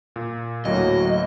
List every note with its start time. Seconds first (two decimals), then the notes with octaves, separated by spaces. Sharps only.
0.16 A#2
0.65 D2 A2 F#3 A#3 D#5